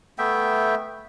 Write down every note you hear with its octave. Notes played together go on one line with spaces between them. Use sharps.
A3 B3 E5 G5